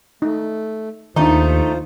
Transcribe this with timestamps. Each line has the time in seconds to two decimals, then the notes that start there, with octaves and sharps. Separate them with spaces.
0.22 A3 D#4
1.16 D#2 D#3 F3 A3 D4 D#4 F4 C5